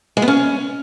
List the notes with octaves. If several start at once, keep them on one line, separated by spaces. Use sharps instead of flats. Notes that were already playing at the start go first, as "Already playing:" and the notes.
G#3
B3
C#4